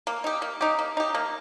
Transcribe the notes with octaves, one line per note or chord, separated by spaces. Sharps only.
A#3
D#4 G4
A#3
D#4 G4
A#3
D#4 G4
A#3